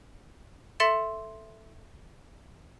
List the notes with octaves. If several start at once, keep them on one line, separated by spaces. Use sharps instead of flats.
A4 E5 C6 A6 C#7 E7